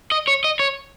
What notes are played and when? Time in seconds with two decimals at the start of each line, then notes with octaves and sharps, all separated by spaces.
0.12 D#5
0.28 C#5
0.44 D#5
0.59 C#5